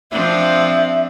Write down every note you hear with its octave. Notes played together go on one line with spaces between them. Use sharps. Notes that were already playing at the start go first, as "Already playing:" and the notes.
F3 C4 D4 E5